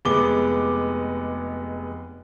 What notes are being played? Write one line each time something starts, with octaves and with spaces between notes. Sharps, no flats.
F1 G#3 B3 D6 G7